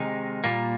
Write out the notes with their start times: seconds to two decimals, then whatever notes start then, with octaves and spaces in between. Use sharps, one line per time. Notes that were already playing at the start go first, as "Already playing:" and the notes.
Already playing: C3 D#3 G#3 D#4
0.44 A#2 G3 A#3